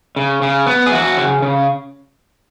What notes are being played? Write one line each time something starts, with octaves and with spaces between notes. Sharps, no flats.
C#3
C#3
B3
G#4
E3 F#4
C#3
C#3